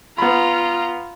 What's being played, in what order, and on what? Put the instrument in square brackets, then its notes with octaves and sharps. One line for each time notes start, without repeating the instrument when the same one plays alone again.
[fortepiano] B3 B5 [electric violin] F4 A#5